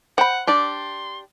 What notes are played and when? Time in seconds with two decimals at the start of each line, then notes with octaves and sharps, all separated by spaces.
0.18 C5 F#5 G5 B5
0.47 D4 G4 D5 C6